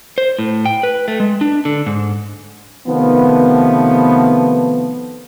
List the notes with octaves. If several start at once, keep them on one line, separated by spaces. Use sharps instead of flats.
C5
A2
G5
B4
A3
G#3
D4
D3
G#2
C3 D#3 F3 A3 B3